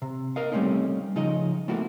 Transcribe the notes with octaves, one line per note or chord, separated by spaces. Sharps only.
C3
A#4 D#5 F5
G3 A3 A#3 C4 C#4 D#4
C#3 F3 D#4 D#5
A3 A#3 C4 E4 F#4